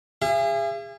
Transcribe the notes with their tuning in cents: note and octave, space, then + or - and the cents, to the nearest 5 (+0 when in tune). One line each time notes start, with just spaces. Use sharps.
G#4 -30 E5 +45